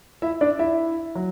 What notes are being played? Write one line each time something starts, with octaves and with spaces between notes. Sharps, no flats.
E4 E5
D4 D5
E4 E5
F#3